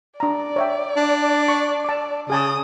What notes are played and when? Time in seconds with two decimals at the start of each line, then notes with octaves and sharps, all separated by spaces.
0.20 D4 D5 A#5
0.56 C#5 E5 G5
0.96 D4
1.48 C#6
1.85 A5 D6
2.30 C#3 G#4 G#5 A5 D#6